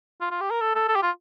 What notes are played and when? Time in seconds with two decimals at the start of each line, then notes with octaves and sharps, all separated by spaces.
0.21 F4
0.31 F4
0.41 G4
0.51 A#4
0.61 A4
0.75 A4
0.88 A4
0.96 G4
1.03 F4